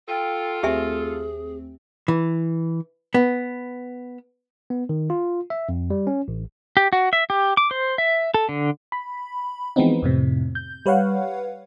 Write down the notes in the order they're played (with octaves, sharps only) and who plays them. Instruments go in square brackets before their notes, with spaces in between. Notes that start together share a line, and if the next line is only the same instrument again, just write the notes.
[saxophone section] F4 A4 [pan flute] G5
[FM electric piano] D#2 A3 C4 [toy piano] G4 E5 G#5 [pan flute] G#4
[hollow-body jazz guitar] E3
B3
[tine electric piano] B3
D#3
F4
E5
F2
G3
C#4
A1
[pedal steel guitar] G4
F#4
E5
G4
D6
C5
E5
A4
D3
[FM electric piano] B5
E3 F3 G#3 B3 C4 D#4
F2 A2 C3
G6
G3 B4 C#5 F5 F#5